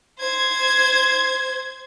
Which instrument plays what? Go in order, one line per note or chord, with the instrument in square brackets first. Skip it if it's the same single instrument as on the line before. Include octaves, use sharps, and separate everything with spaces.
[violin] C5 G#6